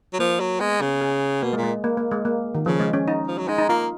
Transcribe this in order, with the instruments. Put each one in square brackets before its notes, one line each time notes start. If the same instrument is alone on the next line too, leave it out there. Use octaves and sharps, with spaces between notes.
[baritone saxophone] F#3
[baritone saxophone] F3 [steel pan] A#3
[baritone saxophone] F#3
[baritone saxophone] G#3 [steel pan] B3
[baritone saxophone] C#3
[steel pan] G#4
[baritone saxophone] B2 [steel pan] A#3
[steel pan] G#3
[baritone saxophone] A#2
[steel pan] G#3
A#3
A#3
G#3
A#3
D#3
[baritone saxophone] C#3 [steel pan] F3
[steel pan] G#3
C#4
D#4
[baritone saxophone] F3
F#3
[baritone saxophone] G#3 [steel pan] D#4
[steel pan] D#4
[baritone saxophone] A#3 [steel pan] F4